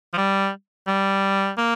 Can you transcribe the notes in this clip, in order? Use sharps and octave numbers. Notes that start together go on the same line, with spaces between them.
F3
G3
G3
A#3